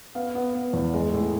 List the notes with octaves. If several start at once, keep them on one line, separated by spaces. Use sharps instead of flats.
B3 F5
B3
B3
E2
G#3
A2